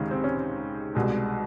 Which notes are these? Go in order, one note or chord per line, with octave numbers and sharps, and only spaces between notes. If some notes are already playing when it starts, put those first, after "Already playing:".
Already playing: C#2 C3 D#3 G#3 C#4
C4
C#4
C2 B2 G#3